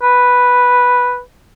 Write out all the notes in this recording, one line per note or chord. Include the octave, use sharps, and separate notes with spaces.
B4